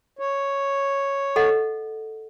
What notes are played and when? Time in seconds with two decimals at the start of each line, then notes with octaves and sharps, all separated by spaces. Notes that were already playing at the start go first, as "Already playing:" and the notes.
0.19 C#5
1.36 A4 D#5 F#5